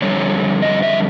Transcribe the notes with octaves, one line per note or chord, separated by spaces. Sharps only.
F2 D3 G3 C#5
D#5
E5